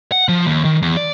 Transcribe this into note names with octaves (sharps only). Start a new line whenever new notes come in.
F#5
F3
D#2
D#3
E2
D5